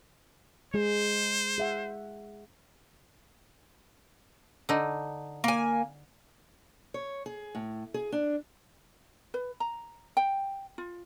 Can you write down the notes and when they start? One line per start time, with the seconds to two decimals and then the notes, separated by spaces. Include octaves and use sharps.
0.74 G#3 G#4 C5
1.58 G#4 E5 F#5
4.69 D3 D#4
5.44 A#3 G#5
6.94 C#5
7.26 G#4
7.55 A2
7.94 G#4
8.12 D4
9.34 B4
9.60 A#5
10.17 G5
10.78 F4